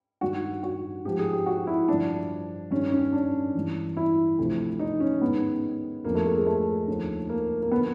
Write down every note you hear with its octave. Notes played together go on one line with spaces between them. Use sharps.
G2 D#3 F#4
F#4
G#2 F3 G4
G#4
G4
F#4
E4
G2 D3 F3 D4
G2 D#3 C#4
C#4
D4
G2 E3
E4
D2 C3 F3
D#4
C#4
G#2 D#3 B3
F2 D3 F3 A#3
A3
A3
G#3
A3
D#2 D3 F3
A#3
A#3
D3 F3 B3